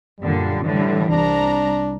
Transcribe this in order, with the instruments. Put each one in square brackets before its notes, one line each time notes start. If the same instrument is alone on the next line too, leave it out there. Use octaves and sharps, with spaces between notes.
[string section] F#2 A#2 D3 [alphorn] G3
[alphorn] A2 [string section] D3 E3 G3
[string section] C2 A#5 [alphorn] D4